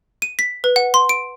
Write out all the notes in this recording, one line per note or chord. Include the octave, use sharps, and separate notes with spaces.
D#7
B6
B4
F#5
C6
D7